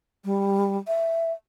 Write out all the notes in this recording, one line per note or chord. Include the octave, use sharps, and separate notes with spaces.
G3
E5